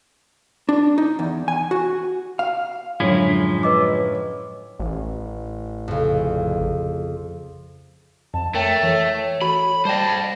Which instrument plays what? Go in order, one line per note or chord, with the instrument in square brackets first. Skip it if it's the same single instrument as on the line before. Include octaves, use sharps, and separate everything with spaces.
[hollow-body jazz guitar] D4
D#4
E2
G#5
F#4
F5
[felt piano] F#2 A2 D3 [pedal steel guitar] F3 G#3 E4
[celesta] B4 D#5 D6
[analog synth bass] A1
[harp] F2 C#3
[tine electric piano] F2 [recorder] A5
[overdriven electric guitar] A3 [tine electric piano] A#4 C#5 [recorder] G5
[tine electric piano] E3 A4 [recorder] C#5
[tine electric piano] F#4 A4 [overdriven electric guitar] B5
[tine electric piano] G3 D5 G5 [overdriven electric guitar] C5 D#5 [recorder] A5